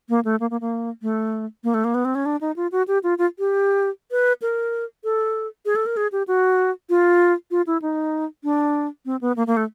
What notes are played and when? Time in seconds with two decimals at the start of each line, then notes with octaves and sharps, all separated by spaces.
0.09 A#3
0.25 A3
0.40 A#3
0.51 A#3
0.61 A#3
1.02 A3
1.64 A#3
1.74 A3
1.84 A#3
1.94 B3
2.05 C4
2.15 C#4
2.26 D4
2.41 D#4
2.56 F4
2.72 F#4
2.88 G4
3.03 F4
3.18 F4
3.39 G4
4.11 B4
4.42 A#4
5.04 A4
5.65 G#4
5.76 A4
5.86 A#4
5.97 G#4
6.12 G4
6.28 F#4
6.90 F4
7.51 F4
7.67 E4
7.82 D#4
8.44 D4
9.05 C4
9.21 B3
9.36 A#3
9.47 A#3
9.57 A3